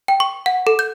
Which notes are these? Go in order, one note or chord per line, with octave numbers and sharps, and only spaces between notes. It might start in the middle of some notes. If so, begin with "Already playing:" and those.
G5
C#6
F#5
A4
G6